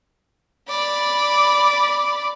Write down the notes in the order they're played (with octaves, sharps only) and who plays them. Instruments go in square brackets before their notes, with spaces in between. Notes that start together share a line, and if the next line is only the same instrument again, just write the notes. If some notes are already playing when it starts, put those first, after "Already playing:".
[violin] D5 B5